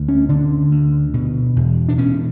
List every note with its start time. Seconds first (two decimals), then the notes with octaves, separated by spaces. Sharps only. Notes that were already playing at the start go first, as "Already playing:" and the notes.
Already playing: D2
0.09 C#4
0.29 D3 D4
0.71 D2
1.14 B2
1.56 E2
1.89 D4
1.98 B2 C#4